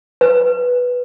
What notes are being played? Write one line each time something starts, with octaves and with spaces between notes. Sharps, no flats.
B4